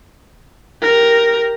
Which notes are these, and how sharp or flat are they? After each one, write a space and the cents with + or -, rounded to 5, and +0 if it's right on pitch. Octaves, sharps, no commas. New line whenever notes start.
G4 +0 A#4 +0